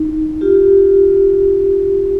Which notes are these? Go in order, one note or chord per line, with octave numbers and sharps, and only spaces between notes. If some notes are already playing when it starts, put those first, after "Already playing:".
Already playing: D#4
F4 G4